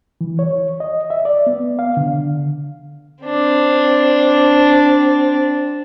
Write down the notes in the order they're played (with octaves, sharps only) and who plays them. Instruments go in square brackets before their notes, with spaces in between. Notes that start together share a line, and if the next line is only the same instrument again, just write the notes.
[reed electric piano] E3
C#5
D#5
E5
D5
B3
F5
D3
[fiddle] C4 D4